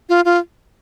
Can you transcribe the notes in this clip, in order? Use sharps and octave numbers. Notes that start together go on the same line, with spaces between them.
F4
F4